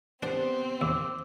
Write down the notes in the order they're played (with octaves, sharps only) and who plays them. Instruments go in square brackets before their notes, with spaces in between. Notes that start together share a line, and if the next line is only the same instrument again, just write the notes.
[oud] B3 G4 C5 [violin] C4 [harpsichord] D4
[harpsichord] D#2 [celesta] D6 E6